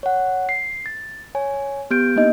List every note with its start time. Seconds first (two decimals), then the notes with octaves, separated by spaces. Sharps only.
0.03 C#5 F#5
0.49 C7
0.86 A6
1.35 C#5 G#5
1.91 B3 G4 G6 D7
2.16 A#3 D4 D#4 D#5